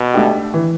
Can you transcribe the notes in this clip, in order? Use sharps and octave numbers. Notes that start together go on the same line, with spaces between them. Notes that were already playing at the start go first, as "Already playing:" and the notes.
Already playing: B2
A3 D4 G4
E3